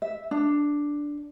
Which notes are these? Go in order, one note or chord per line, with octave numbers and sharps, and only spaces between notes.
E5
D4